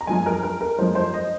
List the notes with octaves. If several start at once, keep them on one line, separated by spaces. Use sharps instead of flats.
A#5
F#2 F3 G#3 G#5
A#4
A#4
A#4
F#2 F3 G#3 C5
C5
D#5